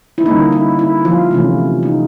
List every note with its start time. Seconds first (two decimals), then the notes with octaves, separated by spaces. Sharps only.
0.18 E4
0.26 D3 G3 A#3 C#4 D#4
0.52 E4
0.79 E4
1.05 F3 F4
1.31 C3 E3 A3 C#4
1.83 D#4